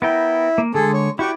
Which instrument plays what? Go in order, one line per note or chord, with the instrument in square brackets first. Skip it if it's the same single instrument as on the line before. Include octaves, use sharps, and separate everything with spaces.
[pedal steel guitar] B3 A#4 G5 [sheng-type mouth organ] E4
[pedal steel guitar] A#3
[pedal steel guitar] D3 G#3 [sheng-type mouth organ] G#4 A4
[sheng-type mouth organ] C#5
[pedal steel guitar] E4 D5 [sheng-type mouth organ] F#4 G4 C#6